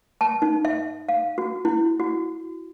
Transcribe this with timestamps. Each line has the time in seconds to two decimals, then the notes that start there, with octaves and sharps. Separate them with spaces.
0.21 A5
0.42 D#4
0.65 E5
1.09 F5
1.38 F#4
1.65 E4
2.00 F#4